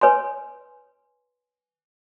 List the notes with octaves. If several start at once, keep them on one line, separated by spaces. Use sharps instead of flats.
B4 C#5 G#5 C6